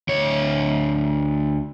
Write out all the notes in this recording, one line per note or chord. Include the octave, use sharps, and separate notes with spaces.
D2 C#5